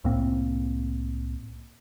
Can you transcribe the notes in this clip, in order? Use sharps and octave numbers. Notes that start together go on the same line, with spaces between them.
C2 A2 A#3 C4